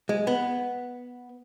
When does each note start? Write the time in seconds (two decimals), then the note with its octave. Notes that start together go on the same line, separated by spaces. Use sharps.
0.09 G#3
0.27 B3